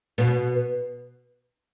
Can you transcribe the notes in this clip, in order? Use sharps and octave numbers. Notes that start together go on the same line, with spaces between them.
B2 B3